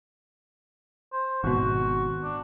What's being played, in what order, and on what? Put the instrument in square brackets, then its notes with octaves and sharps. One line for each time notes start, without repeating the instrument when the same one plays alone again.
[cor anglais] C5
[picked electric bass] G#1 B2 [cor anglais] F#4
[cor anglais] D4